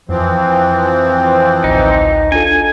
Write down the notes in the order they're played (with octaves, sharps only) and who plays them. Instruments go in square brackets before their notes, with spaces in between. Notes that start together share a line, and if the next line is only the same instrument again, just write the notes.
[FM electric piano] F2 [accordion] E3 F3 C4
[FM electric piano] A1 D2 [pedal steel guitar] D#4
[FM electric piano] D4 F4 A4 [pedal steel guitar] G#5